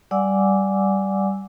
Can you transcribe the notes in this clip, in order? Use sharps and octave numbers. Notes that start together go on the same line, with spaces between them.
G3 D5 F#5 G#5 D6 E6